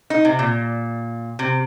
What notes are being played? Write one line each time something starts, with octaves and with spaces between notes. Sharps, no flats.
D#4
C3
A#2
C3